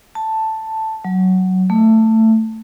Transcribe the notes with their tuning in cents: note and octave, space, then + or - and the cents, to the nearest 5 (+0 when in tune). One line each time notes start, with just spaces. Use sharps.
A5 +5
F#3 +10
A3 +15